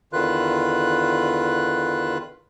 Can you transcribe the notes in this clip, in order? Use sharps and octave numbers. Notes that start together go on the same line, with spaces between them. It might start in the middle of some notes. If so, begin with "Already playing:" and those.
E2 D3 D#3 F4 B4 F#6